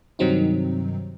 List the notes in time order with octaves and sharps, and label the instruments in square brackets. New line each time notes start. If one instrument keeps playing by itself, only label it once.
[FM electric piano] G2 C3 D#3 F#3 C4 D#4